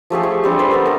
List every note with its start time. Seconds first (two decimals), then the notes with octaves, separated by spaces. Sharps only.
0.10 F3 A3 G4 G#4
0.23 C#6
0.44 G3 C4 D4
0.59 A4 B4 C5 D5
0.71 B3 A4 A#4
0.85 A3 A#4